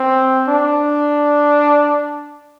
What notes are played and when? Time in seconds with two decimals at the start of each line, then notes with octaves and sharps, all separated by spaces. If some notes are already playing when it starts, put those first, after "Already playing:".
Already playing: C4
0.48 D4